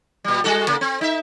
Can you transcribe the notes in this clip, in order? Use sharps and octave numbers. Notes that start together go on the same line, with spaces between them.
A#2 G3
G3 F#4 A4
C#3 A#3
C4
D#4 E5